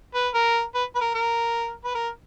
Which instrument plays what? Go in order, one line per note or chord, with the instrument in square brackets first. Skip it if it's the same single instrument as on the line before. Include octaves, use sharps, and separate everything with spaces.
[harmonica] B4
A#4
B4
B4
A#4
A#4
B4
A#4